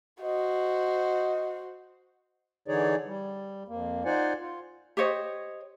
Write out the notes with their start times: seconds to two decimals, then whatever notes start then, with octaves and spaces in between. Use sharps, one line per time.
0.22 F#4 C5 D#5
2.68 D3 E3 D#4 G#4 C#5 D5
3.06 G3
3.68 F2 A#3
4.05 D#4 F4 C5 D5 F#5 G#5
4.40 F4
4.97 G4 C5 C#5 D#5